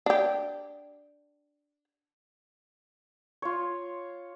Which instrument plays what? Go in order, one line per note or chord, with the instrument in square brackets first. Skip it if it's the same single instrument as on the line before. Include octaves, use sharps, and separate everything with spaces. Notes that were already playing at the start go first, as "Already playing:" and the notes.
[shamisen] D4 G4
[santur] F4 C#5